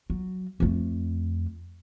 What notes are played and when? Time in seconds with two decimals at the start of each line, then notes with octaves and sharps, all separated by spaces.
0.10 F#3
0.60 F2 A3